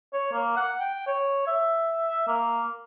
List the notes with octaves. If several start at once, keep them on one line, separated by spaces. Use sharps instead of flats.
C#5
A#3
F#5
G5
C#5
E5
A#3